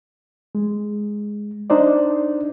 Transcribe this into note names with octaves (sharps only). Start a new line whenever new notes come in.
G#3
D4 D#4 C5 D5